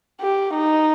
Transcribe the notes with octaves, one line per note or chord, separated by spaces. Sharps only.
G4
D#4